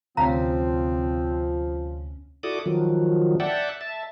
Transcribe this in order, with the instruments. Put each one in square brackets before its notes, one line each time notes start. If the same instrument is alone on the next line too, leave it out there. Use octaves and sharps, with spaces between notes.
[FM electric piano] D2 C3 C#4 [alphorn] F3 [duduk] C4 [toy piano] F5 A#5
[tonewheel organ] E4 F#4 A4 D5 D6 D#6
D#3 F3 F#3
D5 E5 F#5 G5 A5
E5 A5